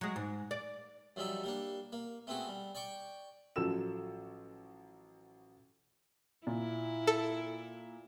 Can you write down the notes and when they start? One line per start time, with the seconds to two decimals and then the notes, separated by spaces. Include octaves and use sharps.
0.01 F#3 G#3
0.16 G#2
0.51 D5
1.16 F#2 F3 G3 D#4 E5
1.44 G3 A#3 D4
1.92 A#3
2.27 A3 B3 C4 F#4 G#4
2.48 G3
2.75 D5 G5 C#6 D6
3.56 A1 F3 F#3 A4 E6 E7
6.47 A#2 E4
7.07 A4